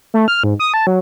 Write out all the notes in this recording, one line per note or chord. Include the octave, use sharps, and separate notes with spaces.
A3
F6
G#2
D#6
A5
F#3